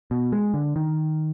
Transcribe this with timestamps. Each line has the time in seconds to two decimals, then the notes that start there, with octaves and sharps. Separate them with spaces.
0.11 B2
0.32 G#3
0.54 D3
0.76 D#3